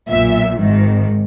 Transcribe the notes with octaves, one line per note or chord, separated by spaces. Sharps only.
B1 A#2 E5
G#1 G#2 D#3